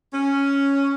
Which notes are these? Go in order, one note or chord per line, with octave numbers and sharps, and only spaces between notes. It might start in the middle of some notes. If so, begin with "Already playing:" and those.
C#4